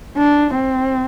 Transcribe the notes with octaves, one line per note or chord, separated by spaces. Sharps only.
D4
C4